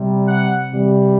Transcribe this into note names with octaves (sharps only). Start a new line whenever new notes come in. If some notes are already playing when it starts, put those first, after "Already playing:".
Already playing: C3 G3
F#5
C3 E3 G3